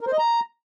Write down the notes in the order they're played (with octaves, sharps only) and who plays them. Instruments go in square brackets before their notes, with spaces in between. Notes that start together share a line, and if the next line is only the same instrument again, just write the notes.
[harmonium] A#4
C5
D#5
A#5